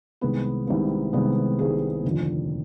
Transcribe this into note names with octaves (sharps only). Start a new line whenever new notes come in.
C2 C3 D#3 G#3 B3 B4
C2 C3 D#3 G#3 B3
C2 C3 D#3 G#3 B3
C2 C3 D#3 G#3 B3 G#4
F1 D#2 D3 F3